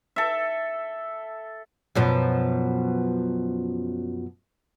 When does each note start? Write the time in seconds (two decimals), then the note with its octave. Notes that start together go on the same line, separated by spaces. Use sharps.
0.16 A4 E5
1.95 F#2 B2 F3